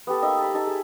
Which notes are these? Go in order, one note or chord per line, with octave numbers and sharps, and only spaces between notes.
B3 G4 A4
A#3 D#4 D#5 E5
A4 B5
D#4 A4 E5
G#4